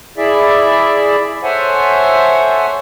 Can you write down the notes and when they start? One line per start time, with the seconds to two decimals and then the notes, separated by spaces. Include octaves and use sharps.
0.17 E4 G#4 D5 E5
1.43 A4 C5 C#5 E5 F#5 G#5